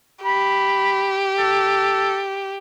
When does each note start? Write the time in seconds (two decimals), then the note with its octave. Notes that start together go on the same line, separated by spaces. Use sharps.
0.25 G4 B5
1.39 A4